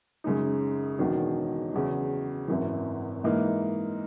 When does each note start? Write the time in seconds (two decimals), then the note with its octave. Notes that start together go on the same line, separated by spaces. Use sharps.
0.24 F#2 C#3 G#3 D#4
0.99 E1 E2 D#3 F#3
1.73 E2 C#3 F#3
2.48 G#1 F#2 E3
3.24 G#2 E3 A#3 D#4